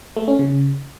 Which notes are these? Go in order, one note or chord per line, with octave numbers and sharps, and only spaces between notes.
A3
C#4
C#3